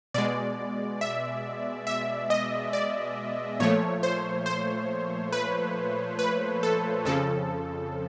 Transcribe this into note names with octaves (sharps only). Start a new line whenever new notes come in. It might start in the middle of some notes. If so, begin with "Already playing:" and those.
B2 G#3 D5
E5
E5
D#5
D5
A#2 F3 A3 C#5
C5
C5
B4
B4
A4
F2 C#3 F3 A4